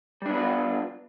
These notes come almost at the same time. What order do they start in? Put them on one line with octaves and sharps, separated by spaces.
G3 D4 B3 B4 F4